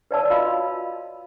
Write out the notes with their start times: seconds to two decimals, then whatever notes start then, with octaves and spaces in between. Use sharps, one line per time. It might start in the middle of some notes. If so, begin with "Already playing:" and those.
0.11 B4 C#5 D5 F5 A5 E6
0.30 F4 F#4 D#5 F5 B5 E6